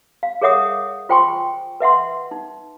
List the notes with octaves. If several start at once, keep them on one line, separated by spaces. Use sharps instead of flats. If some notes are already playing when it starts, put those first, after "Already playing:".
F5
G#4 A#4 C#5 E5 F#5 D#6
F4 C5 G5 G#5 C6 C#6
B4 E5 F#5 C6
D#4